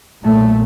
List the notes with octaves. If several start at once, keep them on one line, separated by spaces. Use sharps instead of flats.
B1 A#2 A3